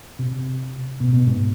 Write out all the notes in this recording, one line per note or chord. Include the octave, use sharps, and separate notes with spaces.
C3
B2
B2
G#2